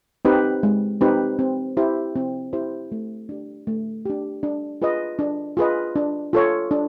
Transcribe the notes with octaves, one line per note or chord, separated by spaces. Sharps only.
C4 D#4 G4 B4
G#3
C4 D#4 G4 B4
C4
E4 G4 C5
C4
E4 G4 C5
A3
D4 G4
A3
D4 G4
D4
F4 G#4 B4 D#5
D4
F4 G#4 B4 D#5
D4
F4 A4 C#5
D4